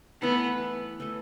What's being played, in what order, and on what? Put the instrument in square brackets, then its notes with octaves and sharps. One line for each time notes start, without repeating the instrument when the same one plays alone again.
[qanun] E3 A3 E4 A4 [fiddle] B3
[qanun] E3 A3 E4 A4